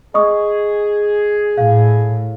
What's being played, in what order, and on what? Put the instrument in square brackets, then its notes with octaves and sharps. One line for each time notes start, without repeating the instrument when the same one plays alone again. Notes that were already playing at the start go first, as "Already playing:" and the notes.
[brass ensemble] G#4 [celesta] D#5 C#6 D#6
[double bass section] A2 [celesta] F5